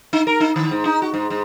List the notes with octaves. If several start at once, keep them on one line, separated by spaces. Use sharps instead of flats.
D#4
A#4
D#4
D#3
G#2
D#4
F#4
G#2
G#2